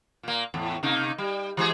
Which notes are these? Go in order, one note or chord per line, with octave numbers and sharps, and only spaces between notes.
A#2 A#3
E2 A2
C3 A#3 D#4
G3
E3 G#3 G#4